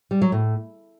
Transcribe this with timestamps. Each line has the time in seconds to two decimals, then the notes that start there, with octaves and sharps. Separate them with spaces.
0.11 G3
0.22 F#3
0.32 A2